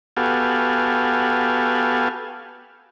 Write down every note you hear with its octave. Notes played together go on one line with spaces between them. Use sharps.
B3 F#4 G4 A4 F5 G#5